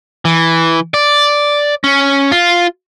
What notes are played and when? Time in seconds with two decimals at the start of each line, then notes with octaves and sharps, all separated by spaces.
0.25 E3
0.94 D5
1.84 C#4
2.32 F4